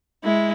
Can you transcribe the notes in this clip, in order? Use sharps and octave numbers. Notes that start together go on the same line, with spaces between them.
G#3 E4